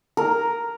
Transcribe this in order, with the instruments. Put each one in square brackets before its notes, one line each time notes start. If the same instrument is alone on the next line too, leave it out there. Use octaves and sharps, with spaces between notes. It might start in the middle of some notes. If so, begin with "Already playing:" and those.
[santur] A#4